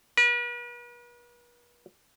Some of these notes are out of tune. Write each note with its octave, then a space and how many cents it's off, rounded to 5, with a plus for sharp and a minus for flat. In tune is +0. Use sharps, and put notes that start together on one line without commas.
B4 -40